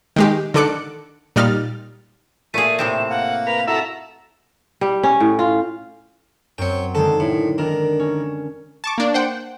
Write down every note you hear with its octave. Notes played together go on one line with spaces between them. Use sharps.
D#3 G#3 G4
D3 D#3 A4 D6 F#6 C#7
A#2 G3 D#4 F6 A6
A#2 A3 G#4 D#7
A2 C3 C4 E7
A#3 F#5
A#4 B4 F7
E4 F#4 A4 E5 A#5
G3
C#4
A2
F4
F#2 C4 C#5 G5
D3 D#3 G#3 A4
A2
D#3 D4 A#4
C#4
A5 C#6 D6
A#3 D4
C5 F#5 G5